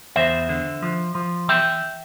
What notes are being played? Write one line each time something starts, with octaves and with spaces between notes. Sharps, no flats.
E2 C5 E5
D3
F3
F3
E3 E5 G5